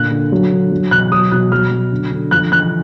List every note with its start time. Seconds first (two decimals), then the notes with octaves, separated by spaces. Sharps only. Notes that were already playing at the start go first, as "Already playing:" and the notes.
Already playing: A#2 D3 F#6
0.11 D3
0.32 F#3
0.52 D3
0.72 F#3
0.91 B2 F#6
1.12 F#3 D#6
1.32 B2 F#6
1.52 F#3 F6
1.71 F#3
1.92 D3
2.12 D3
2.31 F3 F#6
2.52 F3 F#6